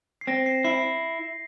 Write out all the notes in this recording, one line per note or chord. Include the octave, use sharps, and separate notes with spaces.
C7
C4 A#6
C7
E4 C7